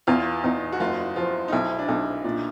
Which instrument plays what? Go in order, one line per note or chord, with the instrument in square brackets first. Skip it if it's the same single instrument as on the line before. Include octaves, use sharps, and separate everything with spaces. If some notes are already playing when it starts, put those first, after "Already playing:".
[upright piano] E2 [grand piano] F4
[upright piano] E2 [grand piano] D#4
[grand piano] F#4
[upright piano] F#1 [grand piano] F4
[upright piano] F3 [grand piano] F4
[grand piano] D#4
[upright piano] B1 [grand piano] E4
[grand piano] D4
[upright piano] B1 [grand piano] D#4
[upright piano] A#2 [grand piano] D4